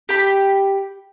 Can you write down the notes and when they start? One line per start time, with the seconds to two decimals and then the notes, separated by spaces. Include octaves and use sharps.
0.09 G4 B5